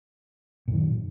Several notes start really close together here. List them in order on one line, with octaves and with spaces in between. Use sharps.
A#2 F#2 D#3